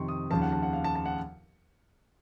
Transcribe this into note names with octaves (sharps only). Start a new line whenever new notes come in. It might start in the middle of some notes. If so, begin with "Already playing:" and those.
Already playing: F2 C3 D#3 C6 C#6
D#6
D#2 C#3 F3 A5
F#5
A5
F#5
F5
A5
A5
F#5